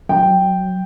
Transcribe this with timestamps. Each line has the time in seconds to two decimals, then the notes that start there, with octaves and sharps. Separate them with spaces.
0.09 F#3 G5